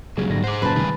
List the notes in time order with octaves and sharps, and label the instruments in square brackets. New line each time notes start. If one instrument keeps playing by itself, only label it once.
[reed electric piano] C#2 [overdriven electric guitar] A#2 F#3 [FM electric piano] G3 G#4
[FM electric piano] G#2 A#6 [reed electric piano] D3 G3
[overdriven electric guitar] G#4 C5 [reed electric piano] F#5 D6
[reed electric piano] F#2 A#2 C#3 [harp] B4 A5
[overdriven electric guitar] G2 G#4 [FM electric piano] C3 D#3 G#3